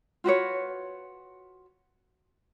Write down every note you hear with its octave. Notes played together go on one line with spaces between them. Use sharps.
F4 F#4 B4 C#5